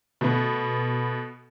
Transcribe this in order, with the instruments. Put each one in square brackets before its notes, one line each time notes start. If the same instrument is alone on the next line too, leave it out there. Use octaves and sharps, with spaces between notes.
[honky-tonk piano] B2 A3 B3